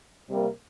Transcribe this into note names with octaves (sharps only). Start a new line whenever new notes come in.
C3 G3 A#3